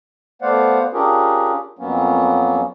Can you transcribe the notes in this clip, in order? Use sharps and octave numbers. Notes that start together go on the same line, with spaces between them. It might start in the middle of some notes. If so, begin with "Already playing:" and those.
A3 B3 C5 D5 F5 F#5
C#4 D4 F4 G4 G#4 A#4
F2 F#3 A#3 B3 C#4